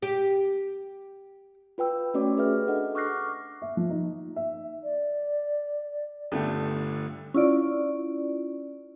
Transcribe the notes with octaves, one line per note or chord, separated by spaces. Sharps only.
G4
F4 B4 G5 E6
A3 C#4 F#4 C#5 D5 D6
G4 G#4 B4 E5 F6
D4 A4 D#5 F#5
C#6 D6 F6 F#6 A#6 C7
E5
F3
D#4
E5
D5
G1 D3 A3 G4
C#4 E4 F4 D5